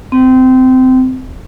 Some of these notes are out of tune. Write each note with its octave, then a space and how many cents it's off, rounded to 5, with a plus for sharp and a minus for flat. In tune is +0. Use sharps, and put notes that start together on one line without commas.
C4 -20